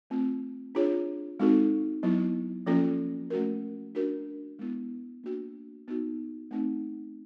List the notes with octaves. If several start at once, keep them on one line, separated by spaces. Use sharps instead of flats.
A3 C4 F4
D4 F4 G#4 C#5
G#3 C4 D#4 F#4 A4
F#3 B3 E4
F3 A#3 C#4 F4 A4
A3 C#4 F#4 A#4
D4 F#4 A#4
G#3 B3 E4
A#3 D4 F#4
B3 D#4 F#4
A3 C4 D#4